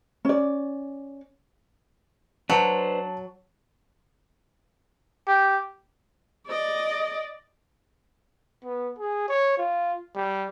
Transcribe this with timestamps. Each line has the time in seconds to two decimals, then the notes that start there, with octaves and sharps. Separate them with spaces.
0.25 C#4 D5
2.50 F#3 D4 B4 C5 A5
5.27 G4
6.48 D5 D#5
8.64 B3
8.99 G#4
9.29 C#5
9.58 F4
10.15 G3